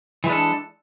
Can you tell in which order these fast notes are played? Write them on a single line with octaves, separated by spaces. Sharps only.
E3 G#3 D4 A4